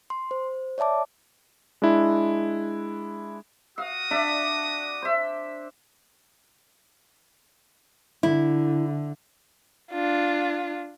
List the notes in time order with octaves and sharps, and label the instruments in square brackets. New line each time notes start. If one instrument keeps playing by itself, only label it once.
[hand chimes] C6
C5
C#5 D5 E5 A5 D6
[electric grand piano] G#3 D4 E4
[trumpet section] F#4 D#6 [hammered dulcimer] F5
[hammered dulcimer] D4 D5 E5
C5 E5
[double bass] D3 [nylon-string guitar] E4
[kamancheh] D4 F4